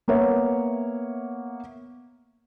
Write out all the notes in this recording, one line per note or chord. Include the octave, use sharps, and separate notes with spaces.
A#3 B3 C#5 E5